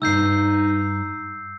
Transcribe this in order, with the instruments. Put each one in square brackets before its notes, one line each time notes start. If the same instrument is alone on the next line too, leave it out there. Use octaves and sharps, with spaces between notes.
[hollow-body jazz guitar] C2 G2 [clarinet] D#4 [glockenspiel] E6 G6 C7